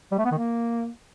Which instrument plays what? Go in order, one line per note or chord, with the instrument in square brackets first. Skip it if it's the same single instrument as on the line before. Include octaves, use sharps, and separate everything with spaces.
[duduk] G3
A3
B3
D#3
A#3